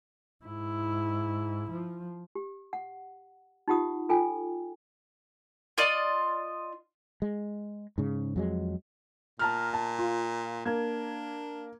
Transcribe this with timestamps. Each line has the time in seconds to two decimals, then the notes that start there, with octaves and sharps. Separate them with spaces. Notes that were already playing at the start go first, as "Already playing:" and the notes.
0.45 G#2 E4
1.70 F3
2.35 G4
2.73 F#5
3.68 D#4 F4 G4 F#5 D#6
4.09 F4 A4 G5 G#5
5.78 F4 D5 D#5
7.22 G#3
7.98 G#2 C#3
8.36 F2 F#3 G#3
9.39 A#2 A5 A#5 F6
9.74 A5
9.99 F4
10.65 A#3 D4 G#6